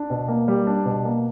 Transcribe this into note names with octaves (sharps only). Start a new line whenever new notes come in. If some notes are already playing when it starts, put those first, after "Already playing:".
Already playing: D4
B2
A#3
G3
D4
B2
A#3